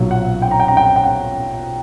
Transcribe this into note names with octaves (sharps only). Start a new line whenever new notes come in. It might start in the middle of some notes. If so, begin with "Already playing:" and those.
Already playing: B1 A#2 F#3
F#5
G5
A#5
G5
A#5
G5
G5
F#5